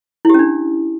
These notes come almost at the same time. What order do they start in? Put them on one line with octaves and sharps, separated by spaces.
E4 G4 C#4 D4